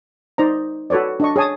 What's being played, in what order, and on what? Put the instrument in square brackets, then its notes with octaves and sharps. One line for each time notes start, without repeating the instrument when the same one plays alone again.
[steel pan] D#4 C5 D5 A#5
F#4 A4 B4 C#5 D5
D4 D#5 C#6
G#4 C#5 G#5 A5 D#6